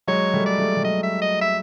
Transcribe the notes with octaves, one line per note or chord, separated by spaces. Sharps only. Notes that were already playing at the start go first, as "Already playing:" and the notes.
F#3 G#3 C#5
G3 A3
D5
G3 A3
G3
F#3 D#5
E5
D#5
E5